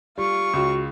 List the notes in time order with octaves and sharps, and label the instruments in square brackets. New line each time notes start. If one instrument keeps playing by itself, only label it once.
[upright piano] G3 [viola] F4 C#6
[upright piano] C#2 [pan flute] F#4